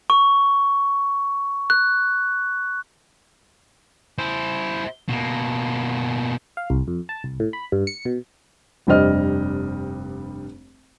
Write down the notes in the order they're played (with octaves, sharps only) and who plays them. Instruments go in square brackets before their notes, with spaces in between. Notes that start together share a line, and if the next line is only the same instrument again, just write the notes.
[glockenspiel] C#6
F#6
[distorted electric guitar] E4 C5
B2 A#3
[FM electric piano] F5
C2
F2
A5
C2
A2
B5
G2
C#7
B2
[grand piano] F1 G2 G3 C5 D#5 F6